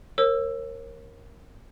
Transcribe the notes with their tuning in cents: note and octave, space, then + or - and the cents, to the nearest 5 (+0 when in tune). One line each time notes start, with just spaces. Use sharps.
A#4 +0 C#5 -35 E6 +10